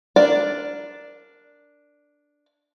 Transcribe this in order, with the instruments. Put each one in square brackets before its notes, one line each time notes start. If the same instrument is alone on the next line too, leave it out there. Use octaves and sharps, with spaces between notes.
[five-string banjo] D4 A#4 D5